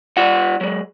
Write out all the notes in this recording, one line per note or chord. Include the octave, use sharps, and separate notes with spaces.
G3 F4 F#5
F#3 G#3